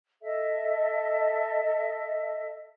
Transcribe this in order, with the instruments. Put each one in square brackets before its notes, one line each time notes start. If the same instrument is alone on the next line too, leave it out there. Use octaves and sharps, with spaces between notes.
[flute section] A4 D#5 E5